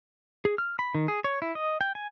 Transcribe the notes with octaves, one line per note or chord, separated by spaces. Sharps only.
G#4
F6
B5
D#3
G#4
C#5
E4
D#5
G5
G#5